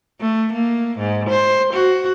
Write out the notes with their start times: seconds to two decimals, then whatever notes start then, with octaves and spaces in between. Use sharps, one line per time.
0.21 A3
0.53 A#3
0.99 G#2
1.29 C5
1.74 F#4